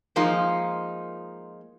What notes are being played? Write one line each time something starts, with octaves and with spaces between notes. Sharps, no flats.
F3 G#3 A#3 D#4 F4